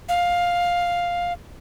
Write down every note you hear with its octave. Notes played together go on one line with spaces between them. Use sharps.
F5